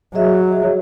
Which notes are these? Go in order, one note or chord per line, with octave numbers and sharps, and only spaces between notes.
F#3 G#4 D#5 E5